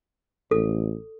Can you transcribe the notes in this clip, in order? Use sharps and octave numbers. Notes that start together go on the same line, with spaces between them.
A1 A4